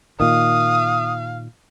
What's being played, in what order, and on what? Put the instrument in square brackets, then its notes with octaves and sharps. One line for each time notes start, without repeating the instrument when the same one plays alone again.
[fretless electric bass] A#2 D#3 [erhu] F5 [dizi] D#6